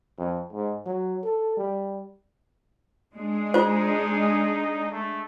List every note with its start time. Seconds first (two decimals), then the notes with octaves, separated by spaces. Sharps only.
0.18 F2
0.53 G#2
0.86 F#3
1.24 A4
1.57 G3
3.14 G#3 D4 G#4
3.54 D#4 F4 C5
4.92 A3